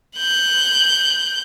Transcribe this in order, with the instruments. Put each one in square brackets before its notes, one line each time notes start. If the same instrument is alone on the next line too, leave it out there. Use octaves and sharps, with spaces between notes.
[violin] F#6 G6